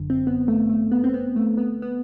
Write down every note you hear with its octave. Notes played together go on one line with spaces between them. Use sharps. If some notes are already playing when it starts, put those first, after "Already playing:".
Already playing: G1 F#2 D3
C4
B3
A3
A3
B3
C4
B3
A3
B3
B3